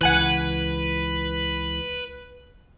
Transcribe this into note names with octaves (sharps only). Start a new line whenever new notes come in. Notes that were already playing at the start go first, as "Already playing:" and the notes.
C#2 E3 B4 F#5 G#5 F#6